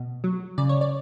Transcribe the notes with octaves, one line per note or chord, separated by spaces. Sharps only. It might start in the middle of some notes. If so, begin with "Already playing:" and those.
Already playing: B2
F#3
C#3 D5
C#5
D5